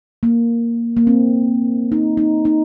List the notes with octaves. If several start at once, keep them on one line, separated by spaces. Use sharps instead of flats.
A#3
A#3
C4
D#4
D#4
D#4